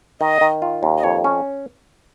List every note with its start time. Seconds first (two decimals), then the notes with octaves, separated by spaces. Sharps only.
0.20 D#3 D#5
0.41 D#3
0.62 F4
0.83 D#2
0.98 D#5
1.04 F2 C#5
1.24 C#4